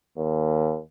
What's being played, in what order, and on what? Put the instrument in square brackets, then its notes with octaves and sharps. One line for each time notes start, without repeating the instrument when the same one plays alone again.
[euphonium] D#2